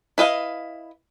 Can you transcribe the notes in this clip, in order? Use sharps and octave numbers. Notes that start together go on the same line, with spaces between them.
E4 B4 D#5 F5